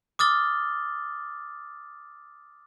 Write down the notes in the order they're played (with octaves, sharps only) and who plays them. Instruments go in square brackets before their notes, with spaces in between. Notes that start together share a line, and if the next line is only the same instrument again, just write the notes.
[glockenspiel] D6 D#6 F6 A6 G7